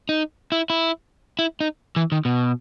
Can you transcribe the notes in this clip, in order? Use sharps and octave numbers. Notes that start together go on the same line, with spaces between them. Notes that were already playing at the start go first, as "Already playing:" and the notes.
D#4
E4
E4
E4
D#4
E3
D#3
B2